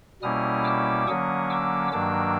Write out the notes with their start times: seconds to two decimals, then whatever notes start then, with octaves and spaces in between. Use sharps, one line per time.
0.22 B2 G3 A#3 C#4 E4 D#6 F6
0.64 D6 E6
1.07 D3 F#3 A#3 C#4 C#6 D#6
1.50 D6 E6
1.92 G2 D#3 F#3 A#3 D4 D6 E6